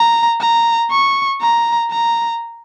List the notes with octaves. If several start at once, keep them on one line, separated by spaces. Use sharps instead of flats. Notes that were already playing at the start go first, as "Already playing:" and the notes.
Already playing: A#5
A#5
C#6
A#5
A#5